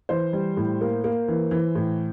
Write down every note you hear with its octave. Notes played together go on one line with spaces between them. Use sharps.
E3 C5
G3
A2
A#3
A#3
E3
E3
A2